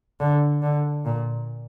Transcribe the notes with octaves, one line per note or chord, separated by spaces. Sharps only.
D3
D3
A#2